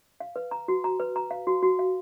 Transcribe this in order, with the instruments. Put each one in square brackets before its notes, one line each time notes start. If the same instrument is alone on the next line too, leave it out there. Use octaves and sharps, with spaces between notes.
[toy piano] F5
B4
A#5
F#4
A#5
B4
A#5
F5
F#4
F#4
F5